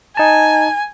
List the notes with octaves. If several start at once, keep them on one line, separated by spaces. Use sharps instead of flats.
D#4 G#5 A5